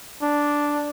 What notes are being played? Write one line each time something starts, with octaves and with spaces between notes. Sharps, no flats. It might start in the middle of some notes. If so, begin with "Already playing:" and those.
D4